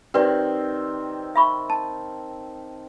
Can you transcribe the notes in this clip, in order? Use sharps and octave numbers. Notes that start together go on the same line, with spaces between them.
D#3 C4 G4 B4 D5
E5 B5 C#6
A5